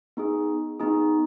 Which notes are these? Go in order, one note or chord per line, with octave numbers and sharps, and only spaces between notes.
B3 D#4 G#4
B3 D#4 G#4